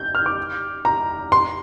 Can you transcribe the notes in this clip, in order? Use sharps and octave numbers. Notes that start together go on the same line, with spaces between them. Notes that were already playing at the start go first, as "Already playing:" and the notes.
Already playing: G6
F6
D6
A#5
C6